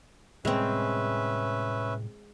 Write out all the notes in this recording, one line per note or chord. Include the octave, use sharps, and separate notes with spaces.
A2 C3 G3 G#3 C4 C#4 B4 E5